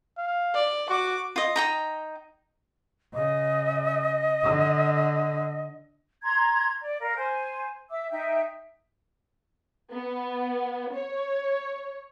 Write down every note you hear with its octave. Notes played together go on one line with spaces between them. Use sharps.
F5
D5
F#4 D6
F4 D#5
D#4 G5 A#5
C#3 D#5
D3
A#5 C6 G#6
D5
A#4 F5
C5 G#5
E5 D6 E6
D#4 E5 G5
B3
C#5